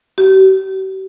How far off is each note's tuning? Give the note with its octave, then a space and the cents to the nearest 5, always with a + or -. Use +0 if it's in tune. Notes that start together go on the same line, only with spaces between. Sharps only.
G4 -45